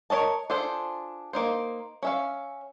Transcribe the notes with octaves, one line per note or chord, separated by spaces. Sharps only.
A#4 C#5 D#5 A5
D4 F4 G#4 A4 C5
A#3 D#4 C5
C#4 E5 F5